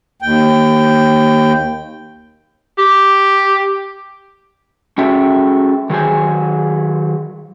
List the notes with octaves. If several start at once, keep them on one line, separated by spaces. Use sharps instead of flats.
D#2 G5
G4
C#4 F#4 G#4 A4 E5 G5
D#3 F#3 G#4 C5 G#5